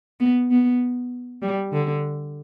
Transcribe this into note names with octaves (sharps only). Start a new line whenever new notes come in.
B3
B3
G3
D3